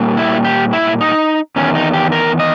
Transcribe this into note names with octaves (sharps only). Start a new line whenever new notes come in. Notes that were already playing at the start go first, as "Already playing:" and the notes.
Already playing: A#2 G3 A#3
E4
G4
E4
D#4
E2 D#3 C#4
D#4
G4
A#4
D#5